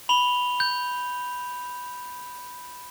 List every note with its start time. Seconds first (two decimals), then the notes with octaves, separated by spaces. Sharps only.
0.09 B5 F7 G7
0.60 G6